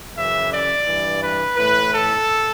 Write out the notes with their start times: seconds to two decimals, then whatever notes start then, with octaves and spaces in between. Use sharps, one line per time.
0.17 F#2 C#3 E3 E5
0.51 D5
0.87 G2 E3
1.22 B4
1.57 A2 E3 B4
1.92 A4